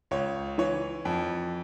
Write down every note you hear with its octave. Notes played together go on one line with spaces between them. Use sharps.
C#2 C#5
E3 C#5
F2